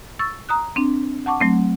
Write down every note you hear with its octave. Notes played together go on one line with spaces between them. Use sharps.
C#6 E6 A6
A#5 D#6 F#6
C4 D4
F#5 A5 C#6 D6
F#3 A3 C4